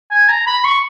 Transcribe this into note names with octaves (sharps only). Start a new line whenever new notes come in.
G#5
A#5
B5
C#6